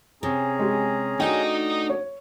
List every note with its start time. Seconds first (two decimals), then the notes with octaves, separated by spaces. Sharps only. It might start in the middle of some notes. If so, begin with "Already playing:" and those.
0.23 C3 C#4 G#4 A#5
0.59 G#3 G4
1.20 A3 D4 D#4 F#4 D#5 G5
1.90 C#5